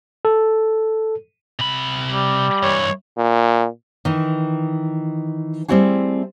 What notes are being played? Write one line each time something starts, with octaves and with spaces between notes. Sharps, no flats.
A4
C3 B5
G3
G2 E3 C#5
A#2
D#3 E3
G3 A3 C4 E4 F#4 G#4